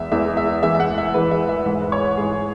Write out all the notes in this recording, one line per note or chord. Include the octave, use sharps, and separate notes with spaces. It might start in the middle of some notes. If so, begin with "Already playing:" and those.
Already playing: E2 E3 G#3 E5
E2 E3 G#3 E5
E5
E2 E3 G#3 E5
E5
F#5
E5
E2 E3 G#3 B4
E5
E5
G#2 E3 G#3 E5
B4
C#5
G#2 E3 G#3 G#4